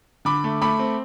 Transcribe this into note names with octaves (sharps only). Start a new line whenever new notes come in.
D3 B5 D6
A3
A3 B5 D6
C4